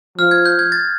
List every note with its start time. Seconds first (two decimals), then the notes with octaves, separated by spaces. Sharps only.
0.18 F3 F6
0.31 G#6
0.46 G6
0.59 G#6
0.72 A6